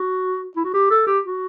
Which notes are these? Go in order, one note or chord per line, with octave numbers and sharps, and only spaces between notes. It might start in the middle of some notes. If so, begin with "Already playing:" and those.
Already playing: F#4
E4
F#4
G4
A4
G4
F#4